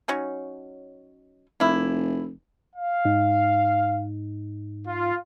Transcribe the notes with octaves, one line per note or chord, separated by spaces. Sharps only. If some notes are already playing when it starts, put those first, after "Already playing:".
F#3 C#4 D#4
F1 A#3 E4
F5
G#2 D#4
F4